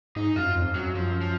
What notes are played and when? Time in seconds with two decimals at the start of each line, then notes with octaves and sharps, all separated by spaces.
0.16 G#2 D#4
0.36 F#2 F4
0.56 F2
0.75 F#2 F#3
0.94 F#2 F3
1.21 F3